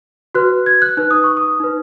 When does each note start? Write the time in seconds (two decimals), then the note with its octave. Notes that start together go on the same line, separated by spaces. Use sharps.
0.35 F#4 B4 F#6
0.66 G#6
0.82 F#6
0.97 D#4 B4 F#6
1.11 D#6
1.24 C#6
1.37 D#6
1.60 D#4 B4